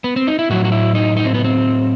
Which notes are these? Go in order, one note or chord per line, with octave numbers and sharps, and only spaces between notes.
B3
C4
D#4
E4
A2 F#3 F#4
F#4
E4
D#4
D#4
C4
B3
C4